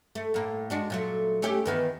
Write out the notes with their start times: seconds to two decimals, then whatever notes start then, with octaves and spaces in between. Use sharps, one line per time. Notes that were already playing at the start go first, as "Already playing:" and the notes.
0.15 A3
0.34 A2 A#3
0.70 G#3 D4 F#4
0.90 A#2 F#3 A3
1.42 A3 C#4 G4
1.66 E2 D#3 B3